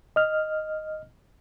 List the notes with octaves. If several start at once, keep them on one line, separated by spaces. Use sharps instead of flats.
D#5 F6